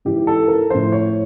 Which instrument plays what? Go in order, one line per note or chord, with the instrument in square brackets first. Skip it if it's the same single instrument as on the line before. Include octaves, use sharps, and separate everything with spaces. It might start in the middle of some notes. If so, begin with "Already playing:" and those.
[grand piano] G#2 E3 G4
A4
A#4
A2 F3 C5
C#5